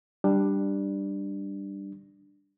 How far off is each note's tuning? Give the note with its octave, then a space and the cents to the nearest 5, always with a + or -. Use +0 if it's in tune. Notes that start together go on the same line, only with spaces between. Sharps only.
G3 +5 D4 +10